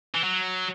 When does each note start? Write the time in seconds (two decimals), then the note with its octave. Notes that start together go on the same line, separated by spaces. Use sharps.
0.15 E3
0.24 F#3